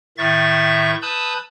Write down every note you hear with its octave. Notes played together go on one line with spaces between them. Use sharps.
A2 D#3 E5 C#6 A6
B4 A5 B5 D#6 E6 G6